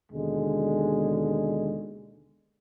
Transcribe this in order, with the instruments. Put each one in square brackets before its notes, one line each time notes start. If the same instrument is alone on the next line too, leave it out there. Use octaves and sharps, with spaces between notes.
[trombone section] D#2 B2 D3 G#3